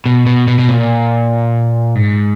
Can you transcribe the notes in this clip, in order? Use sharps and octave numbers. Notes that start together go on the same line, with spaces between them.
B2
B2
B2
B2
A#2
G#2